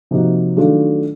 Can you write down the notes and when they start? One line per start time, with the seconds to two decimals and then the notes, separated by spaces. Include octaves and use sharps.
0.11 C3 F3 A#3 D#4 F#4
0.57 D#3 F#3 A3 D4 F4